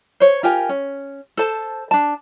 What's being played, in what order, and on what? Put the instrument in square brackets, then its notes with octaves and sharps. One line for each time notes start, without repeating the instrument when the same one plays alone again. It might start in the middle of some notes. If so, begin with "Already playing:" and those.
[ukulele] C5 C#5
F4 G4 A#4 G#5
C#4
A4 C5 A5
D4 A5